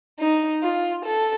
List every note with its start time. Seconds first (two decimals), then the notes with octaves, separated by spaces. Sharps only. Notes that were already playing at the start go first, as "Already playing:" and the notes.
0.18 D#4
0.62 F4
1.05 A4